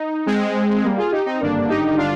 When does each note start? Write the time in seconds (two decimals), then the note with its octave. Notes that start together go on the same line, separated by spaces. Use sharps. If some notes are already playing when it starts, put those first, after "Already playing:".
Already playing: D#4
0.26 G#3 C4
0.84 G3 A#3
0.98 F4 G#4
1.11 D#4 G4
1.26 C4 D#4
1.41 G#1 G2 D3 A#3 D4
1.69 D#4 G4
1.97 D4 F4